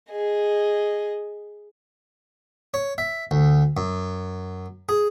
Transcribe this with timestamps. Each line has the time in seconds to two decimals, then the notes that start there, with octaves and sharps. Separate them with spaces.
0.11 G#4 D#5
2.74 C#5
2.98 E5
3.31 D2
3.77 F#2
4.89 G#4